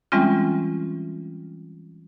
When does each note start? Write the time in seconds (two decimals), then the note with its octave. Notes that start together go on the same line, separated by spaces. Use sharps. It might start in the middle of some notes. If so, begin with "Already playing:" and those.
0.12 E3 G3 G#3 C4 C#4 F4